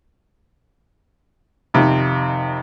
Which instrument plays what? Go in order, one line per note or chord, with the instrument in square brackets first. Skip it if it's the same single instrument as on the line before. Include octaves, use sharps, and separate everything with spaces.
[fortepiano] F2 C3 D#3